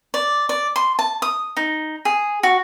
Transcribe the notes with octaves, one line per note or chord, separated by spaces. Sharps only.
D5
D5
C6
A5
D#6
D#4
G#4
F#4